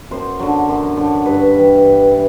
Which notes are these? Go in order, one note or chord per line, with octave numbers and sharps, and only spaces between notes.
F#2 C5
D3 F#3
F#2
D3 F#3
G2 B4
E3 G3
G2
E3